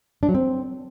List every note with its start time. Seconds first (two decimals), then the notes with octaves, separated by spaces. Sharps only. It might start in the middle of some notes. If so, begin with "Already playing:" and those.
0.23 D4
0.29 F#3
0.34 C4